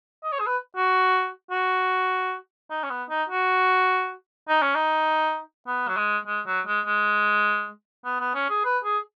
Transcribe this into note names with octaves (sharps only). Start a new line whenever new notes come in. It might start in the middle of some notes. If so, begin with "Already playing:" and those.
D#5
C#5
G#4
B4
F#4
F#4
D#4
C#4
B3
D#4
F#4
D#4
C#4
D#4
B3
F#3
G#3
G#3
F#3
G#3
G#3
B3
B3
C#4
G#4
B4
G#4